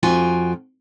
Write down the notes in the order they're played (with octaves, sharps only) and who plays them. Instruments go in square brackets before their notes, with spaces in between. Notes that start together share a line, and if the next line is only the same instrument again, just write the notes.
[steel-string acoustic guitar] F2 F4 F#4 G5 G#5